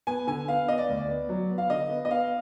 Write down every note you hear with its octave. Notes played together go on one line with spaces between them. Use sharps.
B3 G#5
D3 G#5
B3 F5
B3 D#5
D5
D2
D5
B3
F#3
B3
F5
D3 D#5
B3
D#5
B3 F5